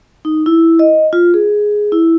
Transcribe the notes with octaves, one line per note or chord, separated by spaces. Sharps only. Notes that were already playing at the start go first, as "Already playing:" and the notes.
D#4
E4
D#5
F4
G#4
E4